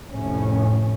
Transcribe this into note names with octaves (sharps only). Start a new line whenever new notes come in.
F1 A2 C#4